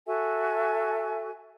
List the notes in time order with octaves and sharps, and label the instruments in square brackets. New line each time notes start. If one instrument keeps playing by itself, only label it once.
[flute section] F#4 A4 E5 G#5